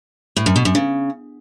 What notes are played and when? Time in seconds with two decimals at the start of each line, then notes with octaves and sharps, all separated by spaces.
0.36 A2
0.46 F#2
0.56 B2
0.65 F#2
0.75 C#3